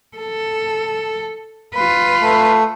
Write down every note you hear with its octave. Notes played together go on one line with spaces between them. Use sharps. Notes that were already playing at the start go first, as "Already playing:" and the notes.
A4
F4 B4
A3